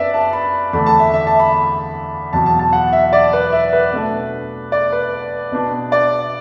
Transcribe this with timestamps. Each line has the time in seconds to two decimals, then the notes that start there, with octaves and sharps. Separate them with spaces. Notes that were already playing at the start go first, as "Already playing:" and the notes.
Already playing: F#2 F#3 B3 D4 B4 D5 E5
0.14 A5
0.33 B5
0.73 E2 D3 A3 D4 B5
0.86 A5
1.00 E5
1.14 E5
1.27 A5
1.40 B5
2.33 E2 B2 F#3 A5
2.46 A5
2.59 A5
2.73 F#5
2.93 E5
3.13 D5
3.33 B4
3.53 E5
3.73 B4
3.93 B2 A3 D4
4.72 D5
4.92 B4
5.52 B2 B3 D4
5.92 D5